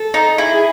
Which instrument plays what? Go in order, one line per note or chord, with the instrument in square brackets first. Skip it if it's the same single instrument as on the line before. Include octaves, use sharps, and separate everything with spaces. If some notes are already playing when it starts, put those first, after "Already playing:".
Already playing: [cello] A4
[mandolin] D#4
[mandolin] E4 [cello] G#4